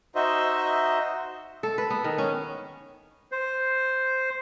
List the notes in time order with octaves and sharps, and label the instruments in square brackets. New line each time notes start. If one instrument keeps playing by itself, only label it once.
[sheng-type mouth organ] D#4 F#4 C5 D#5 E5
[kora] A4
B4
B3
D#3
C#4
[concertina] C5